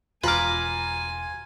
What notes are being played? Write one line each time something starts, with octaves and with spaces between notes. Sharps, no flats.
E1 F4 B4 G#5 A#5 D6 F6